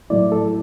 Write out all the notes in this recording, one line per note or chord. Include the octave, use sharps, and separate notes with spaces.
A2 F#3 A3 E4 D5
A4